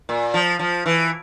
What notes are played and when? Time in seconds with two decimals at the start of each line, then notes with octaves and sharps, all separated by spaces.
0.09 A#2
0.34 F3
0.59 F3
0.86 E3